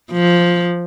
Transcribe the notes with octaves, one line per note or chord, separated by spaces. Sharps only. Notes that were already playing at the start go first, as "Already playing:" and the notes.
F3